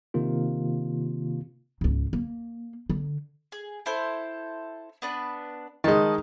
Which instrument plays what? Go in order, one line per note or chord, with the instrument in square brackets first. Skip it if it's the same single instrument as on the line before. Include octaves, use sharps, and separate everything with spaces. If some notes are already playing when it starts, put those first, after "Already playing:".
[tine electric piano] C3 D#3 A#3 F4
[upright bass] C#2 G#2
A#3
D3
[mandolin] G#4
E4 A4 C5
B3 D4 B4
[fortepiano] D#3 G#3 [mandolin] D#5 A5